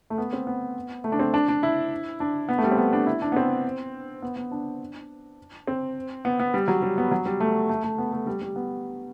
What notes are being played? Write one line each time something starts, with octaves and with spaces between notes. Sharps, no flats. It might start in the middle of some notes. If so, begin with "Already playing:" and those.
A3
B3
C4
B3
A3
D4
C4
D4
D4
E4
D4
B3
A3
G3
C4
B3
D4
E4
D4
B3
C4
B3
B3
D4
C4
B3
B3
G3
F#3
G3
B3
F#3
G3
A3
A3
A3
B3
A3
G3
G3
B3